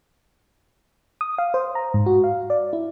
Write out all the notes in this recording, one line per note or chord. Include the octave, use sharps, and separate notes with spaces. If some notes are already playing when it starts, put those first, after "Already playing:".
D#6
F5
C5
A#5
G#2
F#4
F5
D5
E4